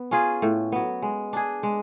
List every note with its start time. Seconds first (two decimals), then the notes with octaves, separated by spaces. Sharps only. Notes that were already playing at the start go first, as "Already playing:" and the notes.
Already playing: B3
0.11 C#4 F4 G#4
0.42 A2
0.72 F#3 B3
1.02 G#3
1.33 D4 G#4
1.63 G#3